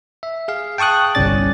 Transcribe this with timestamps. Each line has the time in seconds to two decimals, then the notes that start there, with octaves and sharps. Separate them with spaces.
0.23 E5
0.48 G#4 F5
0.78 G5 A5 C#6 D#6 F#6
1.15 G1 C2 C#4 D5 A6